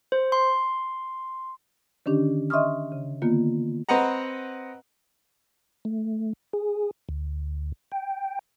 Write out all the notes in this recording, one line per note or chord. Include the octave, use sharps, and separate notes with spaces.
C5
C6
D3 D#3 C#4 D4 G4
D#5 E5 C6 C#6 D#6 F6
C#3
D3 D#3 A#3 B3 F4
C4 B4 D#5 F#5 A#5
A3
G#4
D2
G5